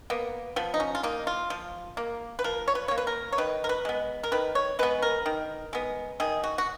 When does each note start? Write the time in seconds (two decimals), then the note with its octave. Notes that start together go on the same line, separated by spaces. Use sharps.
0.10 A#3 B3
0.56 F3 B3
0.74 D#4
0.80 C#4
0.95 F4
1.03 A#3 D#4
1.27 F4
1.50 F3
1.97 A#3
2.39 B4
2.44 F3 A#4
2.68 C#5
2.75 B4
2.88 A#3 C#5
2.98 B4
3.07 A#4
3.32 C#5
3.38 D#3 B4
3.64 A#4
3.69 B4
3.85 G#3 B3
4.23 A#4
4.32 D#3 B4
4.55 C#5
4.79 G#3 B3 B4
5.02 A#4
5.26 D#3
5.73 G#3 B3
6.20 D#3 G#4
6.43 F#4
6.58 F#4